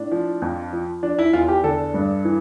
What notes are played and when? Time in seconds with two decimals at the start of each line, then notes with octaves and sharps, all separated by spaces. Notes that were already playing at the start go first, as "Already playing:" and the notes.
Already playing: A2 D4
0.11 F3
0.42 F2
0.73 F3
1.03 F3 D4
1.19 E4
1.33 E2 F4
1.48 G4
1.64 D3 A4
1.94 G2
2.25 E3